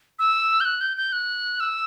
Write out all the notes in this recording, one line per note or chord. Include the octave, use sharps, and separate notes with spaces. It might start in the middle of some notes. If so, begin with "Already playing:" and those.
E6
G6
F#6
G6
G6
F#6
E6